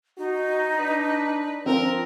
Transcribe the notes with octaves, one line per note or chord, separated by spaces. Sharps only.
D#4 F#4
D4 B4
F3 C4 A#4